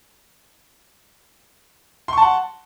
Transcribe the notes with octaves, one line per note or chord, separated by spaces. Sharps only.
F#5 A5 C6 C#6